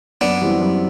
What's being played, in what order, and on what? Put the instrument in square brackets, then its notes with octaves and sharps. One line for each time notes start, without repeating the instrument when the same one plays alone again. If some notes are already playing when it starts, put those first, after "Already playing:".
[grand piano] F#2 [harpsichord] B3 D4
[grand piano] E3 G3 C4
F#2